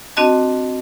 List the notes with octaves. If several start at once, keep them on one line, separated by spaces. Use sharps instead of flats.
C4 D4 F#4 D#5 A5